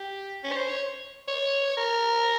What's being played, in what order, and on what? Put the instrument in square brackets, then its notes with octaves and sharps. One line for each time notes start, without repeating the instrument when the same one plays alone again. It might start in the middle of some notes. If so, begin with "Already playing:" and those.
Already playing: [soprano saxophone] G4
C#4
C#5
C5
C#5
C#5
A#4